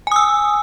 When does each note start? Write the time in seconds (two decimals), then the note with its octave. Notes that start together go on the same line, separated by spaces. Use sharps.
0.07 G#5
0.12 D#6
0.16 E6